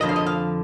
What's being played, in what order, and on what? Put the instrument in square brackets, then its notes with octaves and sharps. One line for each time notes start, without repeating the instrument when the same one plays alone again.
[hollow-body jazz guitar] F2 D3 F3 D#5
F5
D#5
F5